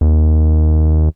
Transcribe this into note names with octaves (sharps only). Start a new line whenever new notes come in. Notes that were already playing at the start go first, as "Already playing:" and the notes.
D#2